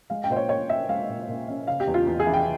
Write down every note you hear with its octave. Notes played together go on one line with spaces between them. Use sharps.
G#3 F5
G5
A#2 C5
C#5
A#2 C#5
C#4 E5
G#3 F5
A#2
A#2
C#4
C#3 F5
G4
E2
F4
E2
G#4
E3
G5